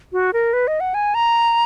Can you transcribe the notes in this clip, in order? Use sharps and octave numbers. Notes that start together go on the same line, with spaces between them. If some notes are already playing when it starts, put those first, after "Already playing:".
F#4
A#4
B4
D#5
F#5
G#5
A#5